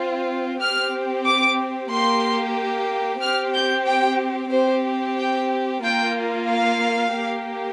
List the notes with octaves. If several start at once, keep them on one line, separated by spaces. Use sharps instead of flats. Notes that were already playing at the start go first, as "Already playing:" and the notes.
Already playing: C4 F4
C4 G4 F6
D6
A#3 G4 C6
C4 G4 F6
G6
G5
C4 G4 C5
G5
A#3 F4 G5
F5
A#3 G4